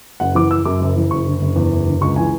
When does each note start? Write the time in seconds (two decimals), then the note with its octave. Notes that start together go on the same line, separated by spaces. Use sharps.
0.20 F#1 F#5
0.35 E3 D6
0.51 F#1 E6
0.65 F#2 D6
0.80 F#1
0.96 E3
1.11 F#1 C#6
1.26 D3
1.41 F#1
1.56 E2
1.72 F#1
1.86 D3
2.01 C#2 C#6
2.16 E3 G#5